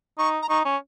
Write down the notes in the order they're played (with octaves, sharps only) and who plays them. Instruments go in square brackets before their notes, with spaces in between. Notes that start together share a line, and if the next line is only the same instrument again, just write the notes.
[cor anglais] D#4 [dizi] C#6
[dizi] A#5
[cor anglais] D#4 [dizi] C#6
[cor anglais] C#4